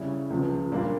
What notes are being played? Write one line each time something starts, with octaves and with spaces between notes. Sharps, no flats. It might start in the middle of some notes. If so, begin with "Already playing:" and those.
Already playing: C#3 G3 C#4 E4
C#2 C#3 F3
A#2 G3 A#3 D4 F4